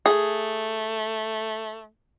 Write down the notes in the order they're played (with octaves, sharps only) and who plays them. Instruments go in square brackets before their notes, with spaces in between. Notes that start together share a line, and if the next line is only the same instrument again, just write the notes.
[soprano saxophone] A3 [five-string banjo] G#4